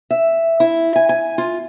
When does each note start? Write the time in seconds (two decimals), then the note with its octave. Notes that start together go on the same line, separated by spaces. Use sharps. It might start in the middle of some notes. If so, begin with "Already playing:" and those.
0.11 E5
0.60 E4
0.96 G#5
1.09 G#5
1.38 F4